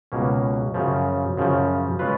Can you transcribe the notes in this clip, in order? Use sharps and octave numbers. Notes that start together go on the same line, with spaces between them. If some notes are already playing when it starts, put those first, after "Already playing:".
C#2 B2 A#3 C#4
F#2 C#3 F3
F#2 C#3 F3
G#3 C#4 F4 B4